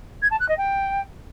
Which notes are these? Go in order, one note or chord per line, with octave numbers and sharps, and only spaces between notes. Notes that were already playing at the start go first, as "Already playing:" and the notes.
G#6
A5
F#6
D#5
G5